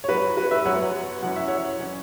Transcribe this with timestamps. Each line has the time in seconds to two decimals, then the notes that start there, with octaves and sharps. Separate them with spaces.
0.04 C#5
0.08 F#2 F#3 B3 F#4 B4
0.37 F#4 B4
0.51 B4 E5
0.65 F#2 F#3 B3 C#5 F#5
1.23 F#2 E3 C#4 F#5
1.36 E5
1.48 C#5 F#5
1.80 E3 C#4